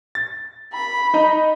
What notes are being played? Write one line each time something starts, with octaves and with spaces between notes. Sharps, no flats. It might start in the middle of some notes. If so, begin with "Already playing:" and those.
A6
B5
D#4 D#5 A#5